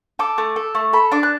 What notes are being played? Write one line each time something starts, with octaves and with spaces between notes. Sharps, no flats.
A4 D6
A3
A4
A3
A4 B5
D4 D6
F#6